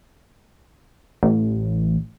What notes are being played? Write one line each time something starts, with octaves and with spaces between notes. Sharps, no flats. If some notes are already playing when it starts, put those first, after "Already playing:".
A1